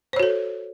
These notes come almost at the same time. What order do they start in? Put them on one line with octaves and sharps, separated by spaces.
C5 C#5 F#4 A4